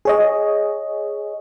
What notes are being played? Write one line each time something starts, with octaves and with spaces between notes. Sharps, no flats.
G#4 C#5 D#5